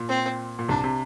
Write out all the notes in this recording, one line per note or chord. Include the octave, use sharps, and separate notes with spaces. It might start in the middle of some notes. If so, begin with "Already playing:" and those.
Already playing: A#2
C4
A#2
C2 C3 D4
C3